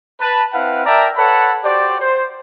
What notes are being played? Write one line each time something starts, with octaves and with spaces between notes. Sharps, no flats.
B4 A5
C4 E4 B4 F5 F#5
A#4 D5 E5 G5 A5 A#5
A4 B4 C#5 F#5 A5 B5
F#4 G4 C5 D5
C5